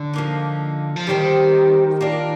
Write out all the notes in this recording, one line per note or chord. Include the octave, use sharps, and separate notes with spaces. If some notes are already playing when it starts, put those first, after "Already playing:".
Already playing: D3
F3 A#3 D#4
F3
D#3 G3 C4 G4 C5
A#3 D4 F4 A#4